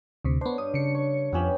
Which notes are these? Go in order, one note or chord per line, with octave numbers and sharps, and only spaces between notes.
D2 C3
B3 D4 C5 C#5
G2 D#6
C#3 C#7
C#5
F2 F3 B3 C#4 G4